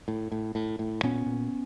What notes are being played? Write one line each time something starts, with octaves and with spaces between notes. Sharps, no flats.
A2
A2
A2
A2
A#2 B3 C#4
A#2